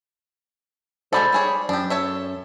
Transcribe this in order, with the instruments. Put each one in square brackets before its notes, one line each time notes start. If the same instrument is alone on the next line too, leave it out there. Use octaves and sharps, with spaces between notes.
[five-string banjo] G#3 F#4 A4 [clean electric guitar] C5 D5 B5
[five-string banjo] G3 G#4 C#5
[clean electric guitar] F#2 [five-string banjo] D4 G4
[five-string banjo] A4 C#5 E5